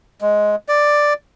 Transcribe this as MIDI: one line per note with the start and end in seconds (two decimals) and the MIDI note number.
0.21 0.55 56
0.69 1.13 74